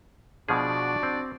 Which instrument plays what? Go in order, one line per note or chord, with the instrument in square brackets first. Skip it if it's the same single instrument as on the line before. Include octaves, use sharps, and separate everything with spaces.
[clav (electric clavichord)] B2 F3 G#4 [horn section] D4 F#4 D5
[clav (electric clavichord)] C4